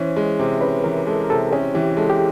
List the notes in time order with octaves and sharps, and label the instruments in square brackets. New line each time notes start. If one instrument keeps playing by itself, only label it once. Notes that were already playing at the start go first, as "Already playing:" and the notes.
Already playing: [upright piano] E3 C#4 [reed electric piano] C5
[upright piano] G#3
C3
[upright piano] C#4 [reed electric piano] B4
[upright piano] E3 [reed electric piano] A#4
[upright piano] G#3 [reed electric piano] A4
[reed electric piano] A#4
[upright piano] C3 [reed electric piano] A4
[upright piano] C#4 [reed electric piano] G#4
[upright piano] E3 [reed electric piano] G4
[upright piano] G#3 [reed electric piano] A4
[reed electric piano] G4